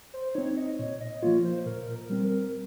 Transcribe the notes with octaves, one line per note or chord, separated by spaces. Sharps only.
C5
C4 D#4 C#5
D#5
A#2 C#5
D#5
F3 A#3 F4 C#5
C5
A#2 A#4
A#4
G3 C4
A#4